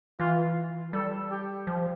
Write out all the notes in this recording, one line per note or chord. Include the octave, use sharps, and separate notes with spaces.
E3 F4
G3 A4
G4
F3